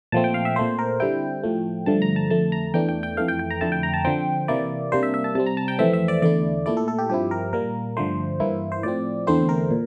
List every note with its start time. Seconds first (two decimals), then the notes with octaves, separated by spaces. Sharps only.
0.12 A#2 F3 A3 C4 A5
0.24 G5
0.34 F5
0.45 E5
0.56 A#2 A3 C4 C5
0.79 A#4
1.00 D3 G3 C4 E4 G5
1.43 A2 F3 A3
1.86 G2 D3 F3 A3 A5
2.02 A#5
2.16 A5
2.30 F2 D3 A3 A5
2.52 A#5
2.74 E2 E3 A3 D4 G5
2.89 G5
3.03 G5
3.17 F2 E3 A3 F5
3.28 G5
3.39 G5
3.51 A#5
3.61 F2 D3 A3 E4 A5
3.72 G5
3.83 A#5
3.94 A5
4.05 D3 F3 C4 G5
4.48 C3 E3 A#3 E4 D5
4.92 C3 G3 A#3 D4 C5
5.03 E5
5.14 E5
5.24 A5
5.35 C3 G3 C4 A5
5.47 A#5
5.57 A5
5.68 G5
5.79 F2 E3 A3 C4 E5
5.94 E5
6.08 D5
6.22 E2 D3 A3 E4 D5
6.66 A#2 A3 E4 D5
6.77 A4
6.88 A4
6.99 G4
7.10 G2 F3 C4 E4 G4
7.31 A#4
7.53 A#2 G3 A#3 A#4
7.97 G2 D3 F3 A3 C5
8.40 G2 E3 A#3 E4
8.72 C5
8.83 A2 F3 C4 D5
9.27 E2 D3 A3 C4 E4 C5
9.49 A#4
9.71 A#2